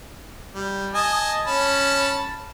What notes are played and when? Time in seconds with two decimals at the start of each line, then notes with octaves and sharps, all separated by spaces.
0.54 G3
0.94 D#5 G#5 A5
1.47 C#4 A5 B5